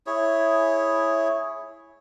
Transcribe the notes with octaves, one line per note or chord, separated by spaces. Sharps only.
E4 G#4 C#5